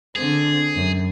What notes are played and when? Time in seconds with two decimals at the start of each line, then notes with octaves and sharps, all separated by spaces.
0.16 D3 C4 G#4
0.75 F#2